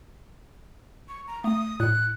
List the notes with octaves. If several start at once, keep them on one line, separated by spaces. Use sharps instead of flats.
C#6
A#5
A3 D#6
A2 F#6